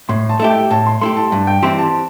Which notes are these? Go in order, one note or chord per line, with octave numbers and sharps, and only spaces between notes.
A2 C6
A5
A3 E4 G4 E5
G5
A2 A5
C6
A3 E4 G4 C6
A5
G2 A5
G5
E3 C4 E4 G4 C6
A5